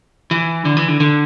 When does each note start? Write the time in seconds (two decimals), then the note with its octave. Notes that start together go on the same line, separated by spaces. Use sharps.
0.31 E3
0.65 D3
0.77 E3
0.88 D3
1.00 D3